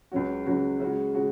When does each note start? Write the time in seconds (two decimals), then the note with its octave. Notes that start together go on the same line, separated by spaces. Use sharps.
0.12 C#2 C#3 F#3 C#4 F#4
0.46 C#2 C#3 F#3 C#4 F#4
0.80 C#3 G#3 F#4
1.15 C#3 G#3 F#4